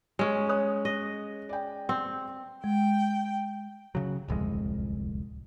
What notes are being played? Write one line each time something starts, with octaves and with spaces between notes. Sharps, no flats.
G#3 C#4 C#5
C#5 D#6 F#6
D#5
D5 G5
C4
G#3 G5
C#3 F#3
D1 C2 F2 G#3